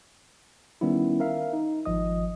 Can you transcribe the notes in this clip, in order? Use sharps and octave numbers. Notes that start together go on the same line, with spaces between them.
D#3 G3 B3 C#4 E4
A#4 E5 F5
D#4
G#1 F3 D#5 D#6